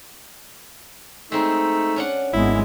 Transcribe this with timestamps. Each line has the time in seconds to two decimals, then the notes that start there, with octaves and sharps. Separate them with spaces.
1.32 G#3 A3 C4 D#4 C5
1.96 C#4 D4 F#5
2.33 G#1 G#3 B3 E4